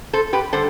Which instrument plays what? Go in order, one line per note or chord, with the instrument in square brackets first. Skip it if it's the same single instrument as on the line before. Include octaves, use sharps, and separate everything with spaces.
[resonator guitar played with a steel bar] A4 C5
G4 B4
D3 G3 A4 C5